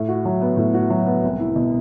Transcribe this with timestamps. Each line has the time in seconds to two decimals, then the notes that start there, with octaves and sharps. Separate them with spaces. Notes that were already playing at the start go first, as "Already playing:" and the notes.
Already playing: A2
0.08 F#4
0.25 F#3
0.41 B3
0.57 A2
0.74 F#4
0.90 F#3
1.06 B3
1.23 C2
1.40 E4
1.56 B2